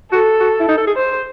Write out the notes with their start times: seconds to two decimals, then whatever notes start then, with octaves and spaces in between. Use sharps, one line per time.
0.12 F#4 A4
0.40 F#4
0.60 E4
0.68 D#4
0.77 A4
0.87 G#4
0.96 C5